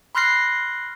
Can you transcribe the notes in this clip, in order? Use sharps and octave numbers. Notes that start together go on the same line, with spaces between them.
B5 C6 F6 F#6 A#6 C7